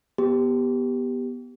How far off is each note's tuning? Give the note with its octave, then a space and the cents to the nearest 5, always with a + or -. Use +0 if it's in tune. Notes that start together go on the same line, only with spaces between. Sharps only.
B3 -10 G4 +0